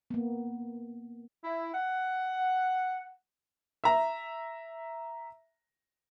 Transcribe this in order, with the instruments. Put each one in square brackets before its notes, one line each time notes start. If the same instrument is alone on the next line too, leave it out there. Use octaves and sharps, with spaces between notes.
[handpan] A#3 B3
[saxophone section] E4
F#5
[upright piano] E5 A#5